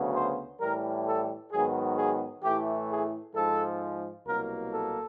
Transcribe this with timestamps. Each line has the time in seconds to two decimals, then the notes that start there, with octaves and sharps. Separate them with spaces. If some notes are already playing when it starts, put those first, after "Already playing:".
Already playing: D2 C#3 F#3 B3
0.15 C5
0.60 A2 E3 G3 A#4
1.07 A4
1.52 G#2 D#3 F#3 B3 G#4
1.98 G#4
2.43 A2 E3 A3 G4
2.90 G#4
3.36 G#2 F3 G#3 A4
4.27 C2 B2 F#3 A#3 A#4
4.73 A4